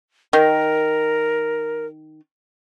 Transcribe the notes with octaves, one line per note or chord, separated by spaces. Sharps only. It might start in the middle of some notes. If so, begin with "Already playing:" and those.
D#3 A#4